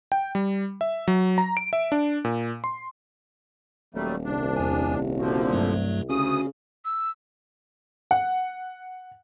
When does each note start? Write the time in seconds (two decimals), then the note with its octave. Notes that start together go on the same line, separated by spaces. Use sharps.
0.12 G5
0.35 G3
0.81 E5
1.08 F#3
1.38 A#5
1.57 D7
1.73 E5
1.92 D4
2.25 A#2
2.64 C6
3.94 D#1 F#3 G3 A3
4.25 C2 D4
4.56 E2 G#5
5.19 A#2 D3 F3 F#4
5.53 G2 F#3 A3
6.10 D2 C#3 C#4 F#4 G#4 D#6
6.85 E6
8.11 F#5